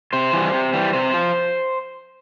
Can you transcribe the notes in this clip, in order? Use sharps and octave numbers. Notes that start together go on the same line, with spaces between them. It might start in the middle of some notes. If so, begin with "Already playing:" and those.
C3 C5
E3 G3
C3
E3 G3
C3 C5
F3